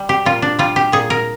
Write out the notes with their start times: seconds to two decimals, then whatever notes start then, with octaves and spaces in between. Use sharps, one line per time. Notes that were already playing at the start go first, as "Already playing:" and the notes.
Already playing: G3
0.09 G4
0.26 A#2 F4
0.42 D4
0.59 G3 F4
0.76 G4
0.92 A#2 G#4
1.10 A#4